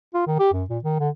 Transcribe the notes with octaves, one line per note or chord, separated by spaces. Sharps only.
F4
D#3
G4
F#2
A#2
D#3
D3